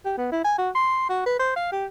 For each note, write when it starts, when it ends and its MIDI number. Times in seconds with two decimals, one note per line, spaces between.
0.05 0.13 67
0.18 0.28 59
0.32 0.44 64
0.44 0.54 80
0.58 0.70 66
0.75 1.06 84
1.09 1.25 66
1.26 1.38 71
1.39 1.51 72
1.56 1.68 77
1.72 1.86 67